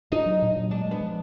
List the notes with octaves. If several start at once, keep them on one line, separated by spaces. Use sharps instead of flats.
D4 D#4
F#3
A#2
F#3
G#3 D4
G#3
B3
F3